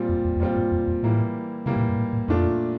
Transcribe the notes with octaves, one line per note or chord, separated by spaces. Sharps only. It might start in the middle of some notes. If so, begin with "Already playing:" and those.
Already playing: A#2 G3 C4 F4
F2
E2
E2
F2 A#2 G3 C4 F4
G2
F2
E2
A2 E3 G3 A#3 E4
C3 E3 G3 A#3 E4
A2
A#2
G2
A2
A2
F2 A#2 A3 D4 F4